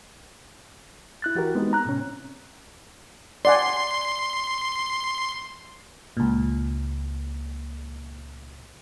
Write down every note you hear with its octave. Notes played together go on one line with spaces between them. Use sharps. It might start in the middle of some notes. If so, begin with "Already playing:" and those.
E4 F#6 A6
E3 F#4 G4 A#4
G#3 B3 C4 D#4
A#5 F#6
A2 C3 C4 C#4
D5 F#5 G#5 C6
C#2 A#2